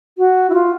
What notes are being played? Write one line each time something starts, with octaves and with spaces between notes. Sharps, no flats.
F#4
E4
F4